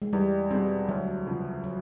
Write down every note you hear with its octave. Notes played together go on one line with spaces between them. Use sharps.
G#3
E2 G3
B2 G3 G#3 C4
D2 F#3
C#3 F3
F#3